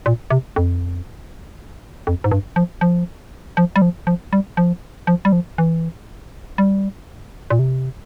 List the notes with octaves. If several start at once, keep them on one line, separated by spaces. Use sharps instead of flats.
A#2
C3
F2
F2
G#2
G2
F3
F3
F3
G3
F3
F3
G3
F3
F3
G3
F3
E3
G3
A#2
C3